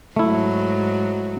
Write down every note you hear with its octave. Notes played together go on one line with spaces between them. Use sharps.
G#2 F#3 A3 E4